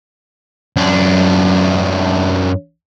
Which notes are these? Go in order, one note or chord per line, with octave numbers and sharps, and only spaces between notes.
F#2 D4